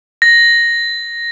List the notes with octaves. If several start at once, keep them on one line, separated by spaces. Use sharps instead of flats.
A#6